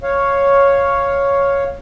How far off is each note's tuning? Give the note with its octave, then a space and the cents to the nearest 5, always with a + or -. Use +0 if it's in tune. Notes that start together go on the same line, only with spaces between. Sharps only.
C#5 +0 F5 +0